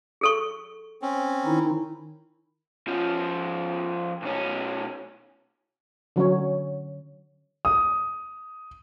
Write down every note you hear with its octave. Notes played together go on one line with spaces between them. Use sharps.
G#4 A4 C#6
C4 C#4
D#3 D#4 E4
F3 C#4
B1 C#4
D3 F#3 C#4 C#5
D#6